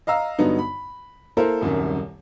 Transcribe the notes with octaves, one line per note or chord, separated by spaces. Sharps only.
D#5 F5 A#5 E6
G2 D3 F#3 B3 D#4
B5
A#3 E4 A4 A#4 C5
D#1 C2 F#2 D#3